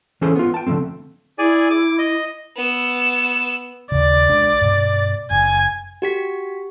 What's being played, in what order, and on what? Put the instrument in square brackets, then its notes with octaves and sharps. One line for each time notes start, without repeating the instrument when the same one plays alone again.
[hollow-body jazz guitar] E3 C#4 G#4 A4 C5
B3 F4
G5 A5
D3 D#3 F3 A3 C4
[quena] E4 [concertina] G#4 D5 G#5
[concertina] D6
D#5
[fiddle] B3 E6
[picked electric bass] D#2 C#3 [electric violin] D5
[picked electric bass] B1 G#3 D4
G2 B2
[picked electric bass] F#1 [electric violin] G#5
[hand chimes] F#4 G4 B6